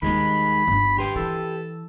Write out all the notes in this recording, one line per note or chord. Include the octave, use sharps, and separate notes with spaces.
D#2 D#3 G3 G#3 D#4 B5
G1 D3
G4 B4 G5 C6
E3 A4